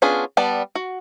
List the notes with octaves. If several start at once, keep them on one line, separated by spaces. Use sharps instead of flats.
B3 C#4 D4 F4 G#4
G3 B3 D5 A5
F#4